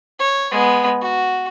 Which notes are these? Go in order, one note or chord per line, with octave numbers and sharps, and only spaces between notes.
C#5
G#3 B3
F#4